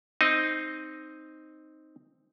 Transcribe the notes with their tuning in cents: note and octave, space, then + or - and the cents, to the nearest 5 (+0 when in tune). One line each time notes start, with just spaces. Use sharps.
C4 +0 D#4 +0 D#5 +0